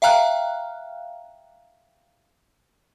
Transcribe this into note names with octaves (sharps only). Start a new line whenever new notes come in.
E5 F5 G5 A#5 F6 F#6